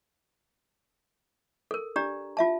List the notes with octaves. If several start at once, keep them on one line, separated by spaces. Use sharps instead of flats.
A4 A#4
D4 G4 D5 A#5
F4 E5 A5